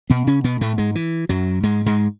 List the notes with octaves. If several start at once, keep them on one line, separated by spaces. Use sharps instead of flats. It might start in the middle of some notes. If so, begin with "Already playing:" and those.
B2 B3
C#3 C#4
B2 B3
A2 A3
G#2 G#3
E3
F#2 F#3
G#2 G#3
G#2 G#3